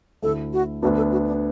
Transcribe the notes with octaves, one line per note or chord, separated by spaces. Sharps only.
D2 D3 A3 E4 A4
F#4
D2 D3 B3 D4 F#4
A4
F#4
D4